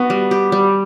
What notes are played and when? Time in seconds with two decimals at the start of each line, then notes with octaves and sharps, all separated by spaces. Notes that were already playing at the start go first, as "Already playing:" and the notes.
Already playing: B3 F#4
0.10 G3
0.31 G4
0.52 G3